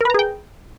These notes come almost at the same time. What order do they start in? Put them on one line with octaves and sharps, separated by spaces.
A#4 B4 A#5 G#4 G5